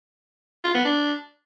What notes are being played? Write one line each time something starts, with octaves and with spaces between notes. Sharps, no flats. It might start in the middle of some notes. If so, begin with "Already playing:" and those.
F4
B3
D4